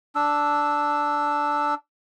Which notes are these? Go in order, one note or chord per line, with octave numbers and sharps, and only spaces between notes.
D4 E6